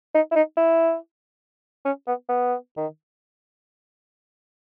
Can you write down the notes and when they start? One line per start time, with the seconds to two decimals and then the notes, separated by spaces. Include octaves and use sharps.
0.14 D#4
0.31 E4
0.35 D#4
0.57 E4
1.85 C#4
2.07 B3
2.29 B3
2.77 D#3